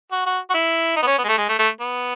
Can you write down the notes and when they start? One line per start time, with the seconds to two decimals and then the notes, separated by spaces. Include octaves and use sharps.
0.12 F#4
0.26 F#4
0.50 F#4
0.54 E4
0.96 D#4
1.02 B3
1.07 C#4
1.18 B3
1.24 G#3
1.29 A3
1.38 G#3
1.49 A3
1.59 A3
1.81 B3